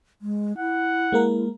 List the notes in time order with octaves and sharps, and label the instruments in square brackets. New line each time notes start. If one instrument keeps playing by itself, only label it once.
[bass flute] G#3
[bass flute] E4 [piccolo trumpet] F#5
[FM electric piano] G#3 A#3 A#4